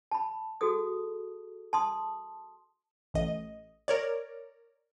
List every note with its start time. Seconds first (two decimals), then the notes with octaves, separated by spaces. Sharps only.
0.11 A5 B5
0.61 F#4 G#4 A4 D#6
1.73 A5 C6 D#6
3.14 A1 D#5
3.88 A#4 C#5 D5